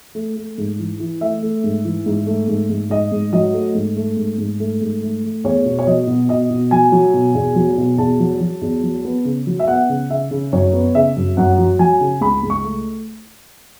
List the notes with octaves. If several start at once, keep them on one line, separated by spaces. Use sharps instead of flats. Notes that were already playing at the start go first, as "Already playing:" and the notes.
A3
A3
G#2
E3
E3
A3 E5
A3
G#2
E3
G#2
A3
G#2
G#2
G#2 D#5
G#2
F#3 D#5
A3
G#2
A3
G#2
G#2
A3
G#2
A3
A3
E2 C#5
B2
C#5
F#3 D#5
B2
B2 D#5
B2
F#3 G#5
F#3
B2
E2
F#3
B2
E2 A5
F#3
F#3
E2
F#3
B3
C#3
F#3
E5
B3 F#5
C#3
C#3 E5
C#3
F#2 C#5
B3
C#3 E5
F#2
F#2 F#5
F#3
F#3 G#5
C#3
C#2 B5
C#2
C#6
A3